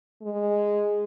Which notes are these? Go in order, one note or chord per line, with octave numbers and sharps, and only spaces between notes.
G#3